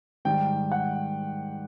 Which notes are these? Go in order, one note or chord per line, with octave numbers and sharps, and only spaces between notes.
G#2 D#3 G3 G5
F#5